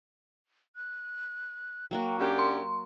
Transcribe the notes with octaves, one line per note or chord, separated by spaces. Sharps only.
F#6
F#3 A#3 F#4 G5
F#2 D4 G4
C6